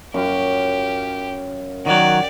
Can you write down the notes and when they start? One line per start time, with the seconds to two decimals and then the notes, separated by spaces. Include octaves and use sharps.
0.14 F#2 F4 G4 B5
1.86 D#3 F#3 G4 D5 F#5